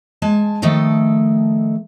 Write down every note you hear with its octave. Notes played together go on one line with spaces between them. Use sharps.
G#3 G#5 A5
D#3 F3 A3 A4 D#5 G5